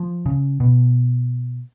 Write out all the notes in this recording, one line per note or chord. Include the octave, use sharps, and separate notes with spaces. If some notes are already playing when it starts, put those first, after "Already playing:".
Already playing: F3
C#3
B2